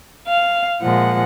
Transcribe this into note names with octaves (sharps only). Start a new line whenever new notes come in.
F5
A#2 F3 G#3 F#5